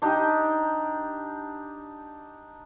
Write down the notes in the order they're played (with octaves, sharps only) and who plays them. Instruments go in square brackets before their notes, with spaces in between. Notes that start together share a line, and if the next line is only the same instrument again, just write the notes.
[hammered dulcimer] D4 D#4 G4